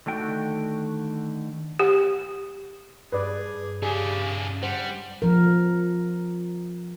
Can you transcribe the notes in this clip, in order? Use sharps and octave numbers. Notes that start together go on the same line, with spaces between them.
D3 D#3 A3 F#4 G5
G4
G2 G#4 B4 D5
C#3 D4 G4 G#4
G3 C5 F#5
F3 A#4